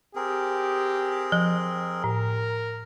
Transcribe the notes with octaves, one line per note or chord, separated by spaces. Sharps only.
C4 G4 G#4 A#4
F3
A2 A#4